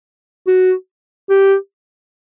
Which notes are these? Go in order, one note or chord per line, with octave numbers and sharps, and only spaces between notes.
F#4
G4